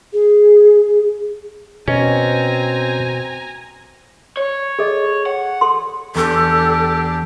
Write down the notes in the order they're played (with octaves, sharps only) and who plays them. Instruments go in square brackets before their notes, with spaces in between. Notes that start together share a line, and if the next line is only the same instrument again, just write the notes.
[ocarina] G#4
[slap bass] B2 [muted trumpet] C4 [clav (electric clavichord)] C#4 [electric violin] G#5 A#5
[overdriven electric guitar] C#5
[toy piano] G#4 A4 D#5
[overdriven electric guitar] F#5
[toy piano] A4 C6
[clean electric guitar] E2 [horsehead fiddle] D4 G4 [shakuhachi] A4